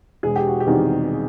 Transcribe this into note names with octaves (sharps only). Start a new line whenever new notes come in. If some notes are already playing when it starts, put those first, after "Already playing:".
E1 G#4
G4
F#4
G4
E2 C3 D#3 G3